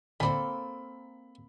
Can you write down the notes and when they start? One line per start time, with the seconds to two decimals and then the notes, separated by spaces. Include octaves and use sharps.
0.20 D3 A#3 C4 D4 A4 B5